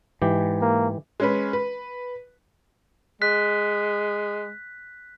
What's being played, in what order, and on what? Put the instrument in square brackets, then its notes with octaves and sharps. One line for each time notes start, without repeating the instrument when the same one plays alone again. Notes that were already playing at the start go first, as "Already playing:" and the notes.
[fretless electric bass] G#2 [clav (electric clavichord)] E3 G4
[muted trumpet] A#3
[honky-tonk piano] G#3 C#4 B4
B4
[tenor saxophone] G#3 [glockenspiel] F#6 B6